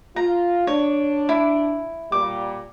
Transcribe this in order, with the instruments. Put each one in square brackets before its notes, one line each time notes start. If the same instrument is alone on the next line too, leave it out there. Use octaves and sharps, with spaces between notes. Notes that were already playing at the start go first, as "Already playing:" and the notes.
[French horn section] F4 [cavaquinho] A#5
[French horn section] D4 [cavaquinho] C#5
[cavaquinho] E4
[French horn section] A#2 G3 [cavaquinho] D6